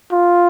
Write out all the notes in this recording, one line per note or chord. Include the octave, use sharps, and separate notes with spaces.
F4